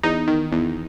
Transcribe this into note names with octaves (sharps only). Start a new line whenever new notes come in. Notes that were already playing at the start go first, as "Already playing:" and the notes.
E2 D#4
D#3
E2